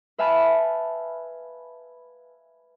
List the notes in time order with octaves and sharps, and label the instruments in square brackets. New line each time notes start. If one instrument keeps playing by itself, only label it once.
[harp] B4 E5 F5 G#5 A5 B5